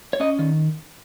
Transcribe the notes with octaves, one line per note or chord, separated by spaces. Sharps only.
C#5
C#4 D#5
D#3